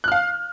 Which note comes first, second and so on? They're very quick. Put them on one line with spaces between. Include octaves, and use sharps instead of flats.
F#6 F6 F5